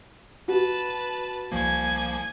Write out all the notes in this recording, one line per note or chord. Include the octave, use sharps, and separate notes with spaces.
F#4 B4 A5
C2 F3 A#3 G#5 G#6